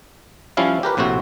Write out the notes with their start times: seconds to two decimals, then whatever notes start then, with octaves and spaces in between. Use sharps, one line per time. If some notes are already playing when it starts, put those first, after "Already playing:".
0.57 F3 G3 C#4 E4 F5
0.83 G4 A#4 B4
0.97 A#1 A2 C3 C4 F#4